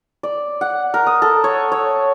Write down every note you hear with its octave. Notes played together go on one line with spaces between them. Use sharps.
D5
F#5
A#4
D#6
A4
C#5
C#5